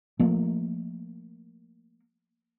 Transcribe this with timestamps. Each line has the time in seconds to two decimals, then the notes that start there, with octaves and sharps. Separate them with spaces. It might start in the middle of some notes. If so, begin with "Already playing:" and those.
0.19 F3 A3 A#3